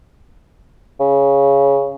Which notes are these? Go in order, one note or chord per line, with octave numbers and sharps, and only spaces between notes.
C#3